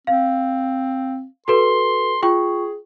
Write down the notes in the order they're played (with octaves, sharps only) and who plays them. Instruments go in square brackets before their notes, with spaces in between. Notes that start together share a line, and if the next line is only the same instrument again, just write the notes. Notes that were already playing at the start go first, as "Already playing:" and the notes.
[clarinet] C4 [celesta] F5
[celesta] F#4 A4 B4 [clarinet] C6
[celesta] F4 G5 C#6 [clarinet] G#4